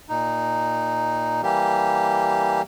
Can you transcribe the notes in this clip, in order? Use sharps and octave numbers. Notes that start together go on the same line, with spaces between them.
A#2 D#4
E3 G3 A#3 G4